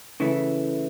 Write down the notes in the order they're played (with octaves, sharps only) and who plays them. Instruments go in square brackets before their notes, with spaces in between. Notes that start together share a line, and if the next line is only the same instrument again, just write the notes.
[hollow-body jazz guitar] C#3 E3 A3 E4